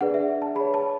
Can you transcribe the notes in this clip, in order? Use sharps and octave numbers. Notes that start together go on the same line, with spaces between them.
D4 G#4 B4 D5 F#5
E5
A5
G#4 C#5 B5
A5